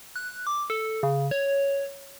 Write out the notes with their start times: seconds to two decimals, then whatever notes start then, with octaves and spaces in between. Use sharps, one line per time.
0.16 F#6
0.47 D6
0.70 A4
1.03 C#3
1.31 C#5